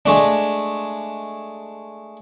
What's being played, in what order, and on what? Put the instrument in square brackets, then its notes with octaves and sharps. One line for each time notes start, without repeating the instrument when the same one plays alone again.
[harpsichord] G#3 A3 D4